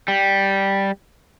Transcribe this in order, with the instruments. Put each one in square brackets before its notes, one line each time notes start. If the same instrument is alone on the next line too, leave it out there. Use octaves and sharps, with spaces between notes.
[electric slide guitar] G3